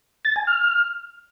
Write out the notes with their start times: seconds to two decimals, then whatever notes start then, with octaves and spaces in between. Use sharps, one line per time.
0.25 A6
0.36 G#5
0.47 F6